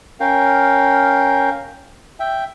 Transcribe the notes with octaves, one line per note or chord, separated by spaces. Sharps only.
C#4 A#4 F5 G5
E5 G5